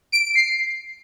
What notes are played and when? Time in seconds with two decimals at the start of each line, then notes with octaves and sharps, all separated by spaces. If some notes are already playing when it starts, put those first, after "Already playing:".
0.12 D7
0.24 D7
0.35 C7